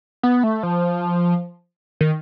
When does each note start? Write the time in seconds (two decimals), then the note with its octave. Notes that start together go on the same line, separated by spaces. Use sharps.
0.23 B3
0.43 A3
0.63 F3
2.01 D#3